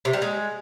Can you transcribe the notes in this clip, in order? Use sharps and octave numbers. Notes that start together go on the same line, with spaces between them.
C3
G3
G#3